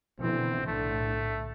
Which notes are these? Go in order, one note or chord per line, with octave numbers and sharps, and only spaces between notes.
B2 D3 E3 C4
B1 A2 D3 A3